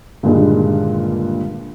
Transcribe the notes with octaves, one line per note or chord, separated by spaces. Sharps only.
G2 A#2 D3 D#3 G3 G#3